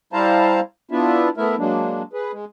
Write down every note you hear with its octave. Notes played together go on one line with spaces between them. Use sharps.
G3 E4 C5 F5 A5 A#5
B3 D4 E4 F4 E5
A3 B3 E4 A#4 E5
F#3 G#3 A#3 D4
G#4 B4
G#3